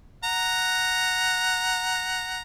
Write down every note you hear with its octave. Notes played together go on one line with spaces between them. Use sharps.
F#5 A#5